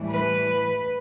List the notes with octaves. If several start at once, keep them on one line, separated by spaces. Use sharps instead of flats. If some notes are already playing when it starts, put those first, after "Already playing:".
Already playing: A2 E3 G3
B4